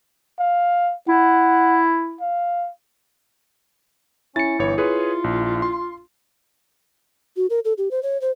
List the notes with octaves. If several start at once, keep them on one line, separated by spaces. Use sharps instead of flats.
F5
E4 F#5
F5
C#4 E4 A6 C#7
G1 E3 C#5
F4 G#4 B4 C#5
A#1
C6
F#4
A#4
A4
G4
C5
C#5
C5